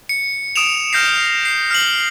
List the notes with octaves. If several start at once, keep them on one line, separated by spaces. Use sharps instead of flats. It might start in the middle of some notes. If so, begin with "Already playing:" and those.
C#7
D#6 D7 E7 F7
F6 G6 A#6 C7
C7
F6 C7 F#7